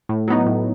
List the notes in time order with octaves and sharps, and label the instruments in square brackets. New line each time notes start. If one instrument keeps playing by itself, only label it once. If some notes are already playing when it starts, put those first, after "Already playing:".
[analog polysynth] A2
F#3 B3 D#4
A2